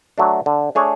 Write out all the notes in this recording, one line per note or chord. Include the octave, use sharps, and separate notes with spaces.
F#3 A3 D4
D3
A3 D4 G#4 C#5